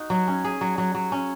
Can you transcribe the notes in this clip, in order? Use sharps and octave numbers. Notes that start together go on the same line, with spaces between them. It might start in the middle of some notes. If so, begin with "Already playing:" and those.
Already playing: D#4 F#4
F#3
C#4
G#4
F#3
F#3
F#3
C#4